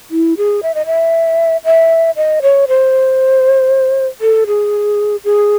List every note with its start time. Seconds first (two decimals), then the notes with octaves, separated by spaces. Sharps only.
0.11 E4
0.37 G#4
0.63 E5
0.75 D#5
0.86 E5
1.65 E5
2.16 D#5
2.42 C#5
2.68 C5
4.21 A4
4.47 G#4
5.24 G#4